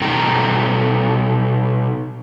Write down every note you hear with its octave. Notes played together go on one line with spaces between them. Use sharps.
B2 D#4 A4 G5 A#5